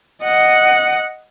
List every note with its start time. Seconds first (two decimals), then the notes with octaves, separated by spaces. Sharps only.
0.23 D#5 F#5